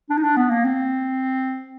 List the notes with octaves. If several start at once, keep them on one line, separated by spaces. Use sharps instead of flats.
D4
D#4
D4
B3
A#3
C4